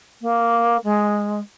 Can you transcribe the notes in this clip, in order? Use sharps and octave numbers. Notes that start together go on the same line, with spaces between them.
A#3
G#3